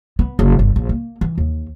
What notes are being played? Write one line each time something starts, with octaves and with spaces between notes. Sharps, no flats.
B3
F#1
G1
A#1
A#3
E3
D#2